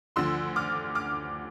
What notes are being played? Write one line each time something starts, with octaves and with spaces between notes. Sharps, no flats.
D2 D3 F3 C6 E6
D6 F6
D6 F6